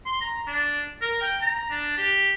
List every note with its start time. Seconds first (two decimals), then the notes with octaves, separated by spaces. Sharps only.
0.06 C6
0.21 A#5
0.47 D4
1.02 A#4
1.22 G5
1.41 A#5
1.70 D4
1.98 G4